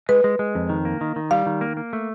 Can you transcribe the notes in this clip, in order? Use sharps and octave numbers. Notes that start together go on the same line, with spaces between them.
G#3 B4
G#3
G#3
F2
D#3
A#3
D#3
D#3
G3 F5
D#3
A#3
A#3
A3